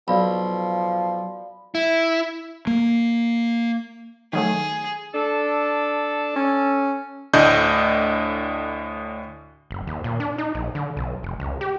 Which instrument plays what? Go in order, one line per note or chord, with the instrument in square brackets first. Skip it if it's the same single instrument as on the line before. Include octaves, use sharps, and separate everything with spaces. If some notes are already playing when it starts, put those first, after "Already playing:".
[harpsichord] B1 [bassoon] F3 [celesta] D5 F5 B5
[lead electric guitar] E4
[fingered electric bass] A#3
[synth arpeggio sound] D#3 F#3 A3 [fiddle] G#4
[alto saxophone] D4 [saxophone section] A4
[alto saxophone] C#4
[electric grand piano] D2 A2 D4 D#5 D#6 G6
[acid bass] F#1
D#2
A#2
D4
D#4
A#1
D3
B1
F1
C#2
G4